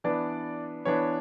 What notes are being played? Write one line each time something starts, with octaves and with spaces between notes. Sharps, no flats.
E3 B3 D4 D5
E3 B3 D4 C#5